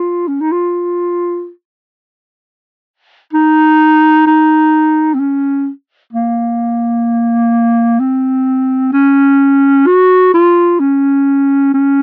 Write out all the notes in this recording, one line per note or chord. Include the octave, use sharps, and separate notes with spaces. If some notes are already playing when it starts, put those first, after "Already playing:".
Already playing: F4
C#4
D#4
F4
D#4
D#4
C4
C#4
A#3
C4
C#4
F#4
F4
C#4
C#4